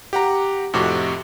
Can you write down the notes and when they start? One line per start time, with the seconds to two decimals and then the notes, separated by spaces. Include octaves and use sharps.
0.13 G4 F#5 A#5
0.73 F2 A2 C3 F#4 D6